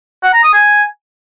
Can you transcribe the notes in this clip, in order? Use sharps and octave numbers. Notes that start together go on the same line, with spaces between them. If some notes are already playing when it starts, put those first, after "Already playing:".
F#5
A#5
D#6
G#5